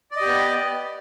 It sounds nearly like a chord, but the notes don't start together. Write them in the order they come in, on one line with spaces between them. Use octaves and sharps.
D5 D#5 G4 B3